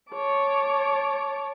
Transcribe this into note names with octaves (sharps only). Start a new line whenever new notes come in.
C#5 A5 D6